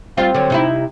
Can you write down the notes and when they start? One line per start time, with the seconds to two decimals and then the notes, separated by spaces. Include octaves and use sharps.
0.18 G3 C4 F4
0.34 D3 F#3
0.50 C3 D#4 E4